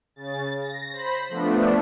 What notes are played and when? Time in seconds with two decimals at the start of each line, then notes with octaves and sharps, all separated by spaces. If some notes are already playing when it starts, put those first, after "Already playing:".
0.16 C#3 A6
0.60 A#6
0.92 C5 B5
1.29 F3 A3 B3 D4